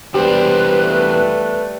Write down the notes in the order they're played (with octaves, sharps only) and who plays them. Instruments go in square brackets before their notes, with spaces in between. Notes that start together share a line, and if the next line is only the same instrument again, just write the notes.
[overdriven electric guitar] E2 D4 [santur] G3 [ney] B4 [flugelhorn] C5
[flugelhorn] A3